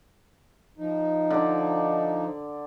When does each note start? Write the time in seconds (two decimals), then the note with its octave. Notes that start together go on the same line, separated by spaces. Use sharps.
0.78 F3 D#4
1.30 D3 D5